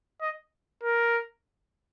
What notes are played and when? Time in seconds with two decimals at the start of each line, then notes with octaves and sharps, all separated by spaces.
0.22 D#5
0.83 A#4